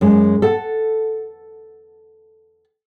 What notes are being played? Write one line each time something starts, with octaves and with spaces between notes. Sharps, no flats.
F#2 G#3
A4 F#5